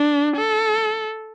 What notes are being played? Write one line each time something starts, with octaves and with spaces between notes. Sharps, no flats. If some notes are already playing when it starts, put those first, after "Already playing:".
Already playing: D4
A4